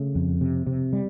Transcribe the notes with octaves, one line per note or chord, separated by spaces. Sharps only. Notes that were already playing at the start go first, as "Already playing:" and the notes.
Already playing: C#3 A3
F2
C3
C3
G3